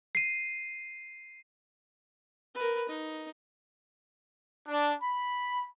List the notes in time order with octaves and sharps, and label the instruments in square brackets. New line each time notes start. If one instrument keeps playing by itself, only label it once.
[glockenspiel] C7 D#7
[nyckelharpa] A#4 B4
D#4
[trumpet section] D4
B5